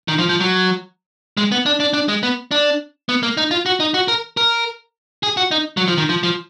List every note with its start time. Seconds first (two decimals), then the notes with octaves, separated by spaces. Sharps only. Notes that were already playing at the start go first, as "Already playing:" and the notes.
0.08 D#3
0.18 F3
0.29 F3
0.40 F#3
1.37 G#3
1.52 B3
1.66 D4
1.80 D4
1.94 D4
2.08 G#3
2.23 B3
2.51 D4
3.09 B3
3.23 A#3
3.37 D#4
3.51 F4
3.66 F#4
3.80 D#4
3.94 F#4
4.08 A#4
4.37 A#4
5.23 G#4
5.37 F#4
5.51 D#4
5.77 F#3
5.88 F3
5.98 D#3
6.09 F3
6.23 F3